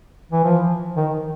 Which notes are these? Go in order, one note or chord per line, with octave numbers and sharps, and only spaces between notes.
E3
F3
D#3